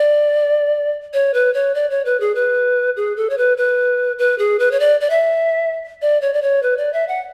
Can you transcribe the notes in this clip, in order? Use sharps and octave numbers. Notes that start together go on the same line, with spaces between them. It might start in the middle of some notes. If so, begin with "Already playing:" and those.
Already playing: D5
C#5
B4
C#5
D5
C#5
B4
G#4
B4
G#4
A4
C#5
B4
B4
B4
G#4
B4
C#5
D5
D5
E5
D5
C#5
D5
C#5
B4
D5
E5
F#5